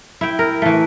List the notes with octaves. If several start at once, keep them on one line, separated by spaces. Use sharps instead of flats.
E4 G5
A#4
E3 A3